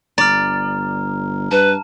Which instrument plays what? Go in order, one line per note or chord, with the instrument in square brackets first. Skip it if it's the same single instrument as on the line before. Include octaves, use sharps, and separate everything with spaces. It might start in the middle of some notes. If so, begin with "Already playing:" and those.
[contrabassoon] G1 [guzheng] D5 [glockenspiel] A#5 F6
[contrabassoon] G2 [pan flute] B4 [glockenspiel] A5